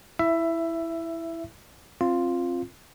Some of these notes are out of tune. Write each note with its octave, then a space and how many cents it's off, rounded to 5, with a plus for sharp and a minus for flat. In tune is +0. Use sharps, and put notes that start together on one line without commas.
E4 +0 E5 +15
C4 +25 F4 +0